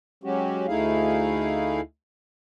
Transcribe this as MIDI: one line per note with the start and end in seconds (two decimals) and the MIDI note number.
0.24 0.66 54
0.24 0.66 56
0.24 0.66 61
0.24 0.66 66
0.24 0.66 67
0.68 1.81 38
0.68 1.81 57
0.68 1.81 63
0.68 1.81 64
0.68 1.81 68
0.68 1.81 77